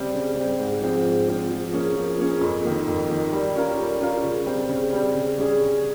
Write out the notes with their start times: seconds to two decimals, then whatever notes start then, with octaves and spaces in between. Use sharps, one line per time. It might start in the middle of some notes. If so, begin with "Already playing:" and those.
Already playing: C#3 G3 C4
0.14 C#3
0.36 G3 C4
0.59 G#2
0.82 F3 G#3 C4
1.05 G#2
1.28 F3 G#3 C4
1.51 F3
1.72 A#3 C#4 G#4
1.95 F3
2.19 A#3 C#4 G#4
2.41 F2
2.64 D#3 A#3
2.88 F2
3.10 D#3 A#3
3.32 G3
3.56 C#4 F4 A#4
3.78 G3
4.01 C#4 F4 A#4
4.24 C#3
4.46 G3 C4
4.69 C#3
4.92 G3 C4
5.14 C#3
5.38 G3 C#4 G#4
5.61 C#3